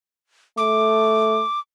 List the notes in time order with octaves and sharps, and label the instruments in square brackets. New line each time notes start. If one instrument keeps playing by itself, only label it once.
[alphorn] A3 [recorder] D6